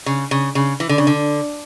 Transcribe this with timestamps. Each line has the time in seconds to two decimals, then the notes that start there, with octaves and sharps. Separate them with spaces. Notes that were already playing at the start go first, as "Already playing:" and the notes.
0.06 C#3
0.31 C#3
0.55 C#3
0.80 E3
0.89 D3
0.98 C#3
1.07 D3